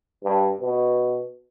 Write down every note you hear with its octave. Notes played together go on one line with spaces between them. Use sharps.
G2
B2